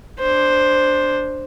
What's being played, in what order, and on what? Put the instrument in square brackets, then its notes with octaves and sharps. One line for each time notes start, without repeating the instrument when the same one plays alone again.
[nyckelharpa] D4 C5